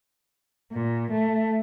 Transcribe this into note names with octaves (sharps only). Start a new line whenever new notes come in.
A#2
A3